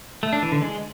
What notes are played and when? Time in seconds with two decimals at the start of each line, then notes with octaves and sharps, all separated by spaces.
0.23 A3
0.33 D4
0.42 E3
0.52 D3
0.62 G#3